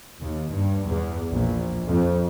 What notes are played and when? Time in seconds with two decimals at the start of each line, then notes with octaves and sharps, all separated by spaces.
0.20 D#2
0.50 G2
0.87 E2
1.29 A#1
1.87 F2